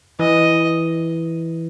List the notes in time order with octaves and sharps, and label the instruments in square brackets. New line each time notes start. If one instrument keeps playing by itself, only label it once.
[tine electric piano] E3 [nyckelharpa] D#5